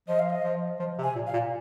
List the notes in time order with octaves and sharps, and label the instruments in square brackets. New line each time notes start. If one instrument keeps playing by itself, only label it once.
[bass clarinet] F3 [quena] D#5
[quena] F5
D#5
[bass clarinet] F3
F3
C3
[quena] G#5
[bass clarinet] A#2
[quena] F5
[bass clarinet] A#2